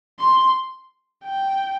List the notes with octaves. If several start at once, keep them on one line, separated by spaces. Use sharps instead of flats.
C6
G5